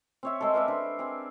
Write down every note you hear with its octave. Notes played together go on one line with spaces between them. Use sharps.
C4 C#5 E5
G#3 A4
A#4 B4 D5 E5
D4 C5
C4 G#4